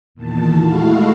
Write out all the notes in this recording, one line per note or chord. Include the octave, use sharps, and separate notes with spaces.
E2 A#2 D#3 A5
G#3 A3 E4 F#4 F5